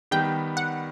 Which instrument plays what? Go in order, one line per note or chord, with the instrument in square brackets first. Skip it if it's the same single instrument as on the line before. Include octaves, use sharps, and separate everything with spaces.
[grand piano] D#3 G3 B3 [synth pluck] G5
[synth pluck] F#5